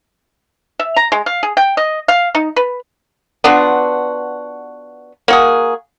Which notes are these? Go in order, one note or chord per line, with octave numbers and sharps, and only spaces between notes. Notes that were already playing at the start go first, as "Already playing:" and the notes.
E5
A#5
G#3
F5
G#4
G5
D#5
F5
D#4
B4
B3 D4 F4 F#4
A#3 F#4 G#4